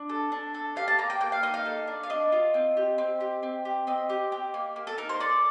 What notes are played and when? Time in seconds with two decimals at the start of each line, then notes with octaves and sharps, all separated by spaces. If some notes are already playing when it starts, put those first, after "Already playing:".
Already playing: D4
0.09 A4
0.32 D4
0.54 A4
0.76 G4 F5
0.88 A5
0.98 A#3 A#5
1.10 G5
1.21 A#3 G5
1.32 F5
1.43 D#4 D#5
1.54 F5
1.66 A4
1.88 D4
2.03 F5
2.10 D4 D#5
2.32 F4
2.54 C4
2.77 G4
2.98 C4
3.21 G4
3.43 C4
3.65 G4
3.87 C4 D#5
4.09 G4
4.32 G4
4.54 A#3
4.76 A#3
4.87 A4
4.98 D#4 A#4
5.09 C5
5.20 A4 D5